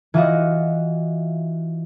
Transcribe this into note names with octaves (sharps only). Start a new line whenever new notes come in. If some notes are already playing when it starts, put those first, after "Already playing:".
E3 F4 F#4 D#5